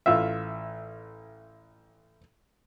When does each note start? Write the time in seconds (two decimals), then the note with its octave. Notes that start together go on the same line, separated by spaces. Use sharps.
0.06 A1 F4 E5